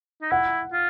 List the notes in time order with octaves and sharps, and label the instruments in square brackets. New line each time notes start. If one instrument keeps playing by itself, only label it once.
[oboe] D#4
[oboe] E4 [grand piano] F#5
[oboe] F4